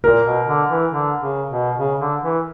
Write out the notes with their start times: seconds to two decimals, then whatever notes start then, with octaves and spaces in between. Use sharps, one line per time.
0.04 A#2 A#4
0.25 B2
0.47 D3
0.70 E3
0.91 D3
1.20 C#3
1.50 B2
1.78 C#3
2.00 D3
2.23 E3